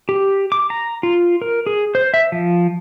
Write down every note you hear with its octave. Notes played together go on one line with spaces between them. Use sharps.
G4
D6
A#5
F4
A#4
G#4
C5
E5
F3